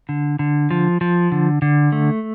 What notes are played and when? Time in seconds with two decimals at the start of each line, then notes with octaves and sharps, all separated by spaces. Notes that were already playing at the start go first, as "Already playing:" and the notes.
0.09 D3
0.39 D3
0.71 F3
1.01 F3
1.32 D3
1.62 D3
1.92 A3